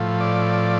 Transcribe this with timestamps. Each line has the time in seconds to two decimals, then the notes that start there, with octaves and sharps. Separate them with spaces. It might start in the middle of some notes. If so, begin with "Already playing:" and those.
Already playing: A2 F3
0.21 D5